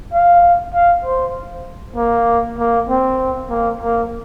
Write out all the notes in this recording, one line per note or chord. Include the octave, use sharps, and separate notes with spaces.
F5
F5
C5
A#3
A#3
C4
A#3
A#3